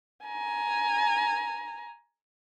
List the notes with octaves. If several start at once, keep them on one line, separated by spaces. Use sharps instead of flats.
G#5 A#5